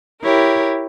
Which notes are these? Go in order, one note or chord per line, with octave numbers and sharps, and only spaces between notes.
E4 G4 A#4 C#5